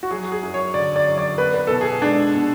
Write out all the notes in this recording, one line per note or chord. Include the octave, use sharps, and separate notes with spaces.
F#4
F#3 G#4
G#4
F#2
C#5
D3 D5
D5
F#2
D5
B3 B4
B4
B2 A4
G#4
G#3 D4
B2